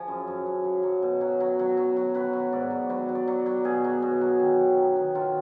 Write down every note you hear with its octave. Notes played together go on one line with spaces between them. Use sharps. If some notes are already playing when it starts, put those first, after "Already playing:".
Already playing: F3 G#4
F#2
F#2
F#2
F#3
F#3
B2
F#3
F#3
F#3
F#3
F#3
F#3 B4
F#3
G#2 D5
F#3
F#3 B4
F#3
D5
F#3
F#3
B2 G#4
F#3
B2
F#3
D#3
F#3
D#3
D#3
F#3 F4